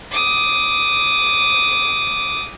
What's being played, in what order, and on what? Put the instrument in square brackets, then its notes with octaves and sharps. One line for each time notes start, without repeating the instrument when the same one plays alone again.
[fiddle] D6 D#6